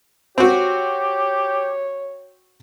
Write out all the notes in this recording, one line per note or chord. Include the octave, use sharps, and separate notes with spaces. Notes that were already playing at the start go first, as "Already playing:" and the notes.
C4 F#4 G4 C#5